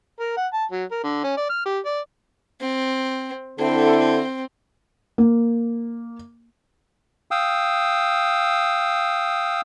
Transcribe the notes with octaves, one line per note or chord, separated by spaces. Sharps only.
A#4
F#5
A5
F#3
A#4
D3
C#4
D5
F6
G4
D5
C4
D3 C4 E4 A4
A#3
F5 G5 D#6 E6